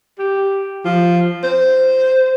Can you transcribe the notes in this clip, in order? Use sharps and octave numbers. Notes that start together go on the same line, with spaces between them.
G4
F3
C5